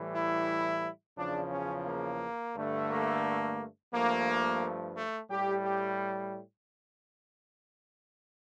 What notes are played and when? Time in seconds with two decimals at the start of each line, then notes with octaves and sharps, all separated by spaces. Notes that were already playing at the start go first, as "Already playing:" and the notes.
Already playing: A2 E3 G3
0.14 E4
1.17 E2 C#3 F3 D4
1.52 C#4
1.86 A#3
2.55 G2 D3 A3
2.90 A#3
3.93 G2 F3 A3 A#3
4.96 A3
5.30 A2 G3 G4
5.65 G4